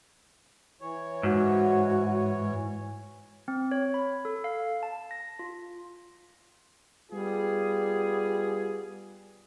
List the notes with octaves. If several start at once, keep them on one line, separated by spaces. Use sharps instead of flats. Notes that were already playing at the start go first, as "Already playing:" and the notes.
E3 C#5
G#2 F#4
C4
C#5
B5
A4
F5
A5
A#6
F4
G3 B3 F4 G#4